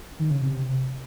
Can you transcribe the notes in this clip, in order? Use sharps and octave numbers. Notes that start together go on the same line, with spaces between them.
D#3
C#3
C3